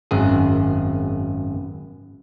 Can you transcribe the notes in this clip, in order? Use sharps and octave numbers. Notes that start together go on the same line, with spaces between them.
G#1 F#2 G#4